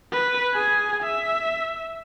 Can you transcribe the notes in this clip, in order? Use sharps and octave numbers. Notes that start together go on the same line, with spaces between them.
B4
G#4 G#5
E5